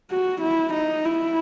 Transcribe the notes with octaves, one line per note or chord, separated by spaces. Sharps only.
F#4
E4
D#4
E4